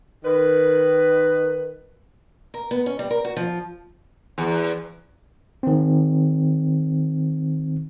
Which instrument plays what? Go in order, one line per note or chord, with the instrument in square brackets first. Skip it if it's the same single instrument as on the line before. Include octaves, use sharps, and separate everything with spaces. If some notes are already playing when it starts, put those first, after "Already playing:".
[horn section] D#3 B4
[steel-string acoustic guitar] A#4
B3
C#4
G3
A#4
F#4
F3
[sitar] E2
[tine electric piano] D#3 C4